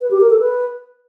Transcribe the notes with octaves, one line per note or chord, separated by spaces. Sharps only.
B4
G4
A#4
A4
B4